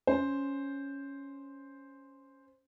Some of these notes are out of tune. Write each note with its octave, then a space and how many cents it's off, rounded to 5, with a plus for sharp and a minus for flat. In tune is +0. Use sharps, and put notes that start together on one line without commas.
C#4 +0 C5 +0